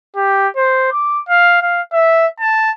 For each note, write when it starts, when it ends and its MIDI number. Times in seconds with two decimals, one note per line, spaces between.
0.16 0.48 67
0.56 0.88 72
0.92 1.20 86
1.29 1.60 77
1.62 1.81 77
1.93 2.27 76
2.40 2.71 81